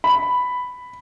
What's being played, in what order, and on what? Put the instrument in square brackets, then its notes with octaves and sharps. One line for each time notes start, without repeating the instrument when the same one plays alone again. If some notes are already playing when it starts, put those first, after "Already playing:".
[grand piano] B5